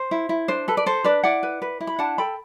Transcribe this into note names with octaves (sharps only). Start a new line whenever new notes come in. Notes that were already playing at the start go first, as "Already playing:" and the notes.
Already playing: C5
E4
E4
D4 C5
A4 B4
D5
A4 C5
D4 B4 D5
E4 D5 F#5
B4
B4
E4
B5
D4 F#5 A5
A4 G5 B5